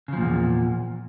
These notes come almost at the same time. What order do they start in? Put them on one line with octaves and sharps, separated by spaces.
C#3 F3 A#2 E2